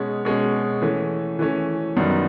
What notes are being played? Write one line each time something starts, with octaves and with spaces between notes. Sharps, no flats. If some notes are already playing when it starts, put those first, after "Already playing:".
Already playing: B2 G#3 C#4
B2 G#3 C#4
E3 A3 C#4
E3 A3 C#4
F#2 D#3 G3 B3